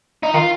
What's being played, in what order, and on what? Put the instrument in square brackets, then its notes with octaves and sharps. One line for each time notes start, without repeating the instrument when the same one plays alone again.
[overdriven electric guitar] D#4
[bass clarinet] D#3 [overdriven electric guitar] F4